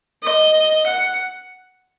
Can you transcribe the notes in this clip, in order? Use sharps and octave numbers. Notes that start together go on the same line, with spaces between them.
D#5
F#5